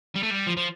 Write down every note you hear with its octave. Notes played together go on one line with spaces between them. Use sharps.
G3
A3
G3
F3
F3